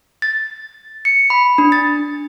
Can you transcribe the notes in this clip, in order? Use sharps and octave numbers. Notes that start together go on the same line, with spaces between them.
A6
C#7
B5
D4
A6